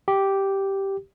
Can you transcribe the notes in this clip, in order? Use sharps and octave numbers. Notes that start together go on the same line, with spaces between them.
G4